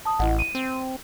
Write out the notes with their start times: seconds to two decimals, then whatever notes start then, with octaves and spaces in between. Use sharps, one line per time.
0.05 A5 D#6
0.19 A1 E4 D#5 F#5
0.39 D#7
0.55 C4